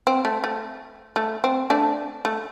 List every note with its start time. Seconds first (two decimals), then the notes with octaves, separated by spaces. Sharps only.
0.07 C4
0.25 A3
0.44 A3
1.16 A3
1.44 C4
1.70 A3 D4
2.25 A3